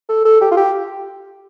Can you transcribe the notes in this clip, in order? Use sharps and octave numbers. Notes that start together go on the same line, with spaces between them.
A4
A4
G4
F4
G4